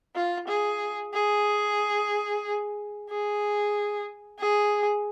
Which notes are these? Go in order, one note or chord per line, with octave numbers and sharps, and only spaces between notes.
F4
G#4
G#4
G#4
G#4